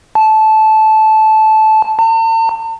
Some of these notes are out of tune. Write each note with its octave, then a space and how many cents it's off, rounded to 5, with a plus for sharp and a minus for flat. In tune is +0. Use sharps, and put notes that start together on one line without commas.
A5 -15
A5 +45